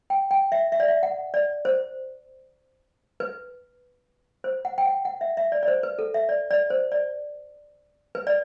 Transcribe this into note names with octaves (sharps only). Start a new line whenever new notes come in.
G5
G5
E5
E5
D5
E5
F#5
D5
C5
B4
C5
F#5
G5
F#5
F#5
E5
E5
D5
D5
C5
B4
A4
E5
D5
D5
C5
D5
B4
D5